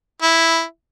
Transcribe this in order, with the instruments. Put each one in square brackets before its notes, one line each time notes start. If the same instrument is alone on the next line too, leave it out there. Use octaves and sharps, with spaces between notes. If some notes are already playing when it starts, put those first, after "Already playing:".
[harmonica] E4